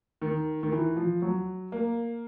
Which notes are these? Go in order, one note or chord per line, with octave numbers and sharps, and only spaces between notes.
D#3
D#3
E3
F3
F#3
A#3